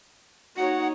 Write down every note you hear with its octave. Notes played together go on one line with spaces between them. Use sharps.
A#3 D#4 F#4 C#5 F#5